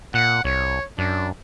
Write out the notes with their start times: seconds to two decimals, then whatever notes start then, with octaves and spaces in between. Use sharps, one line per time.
0.14 A#2 F#5
0.45 C2 C#5
0.98 F#2 D4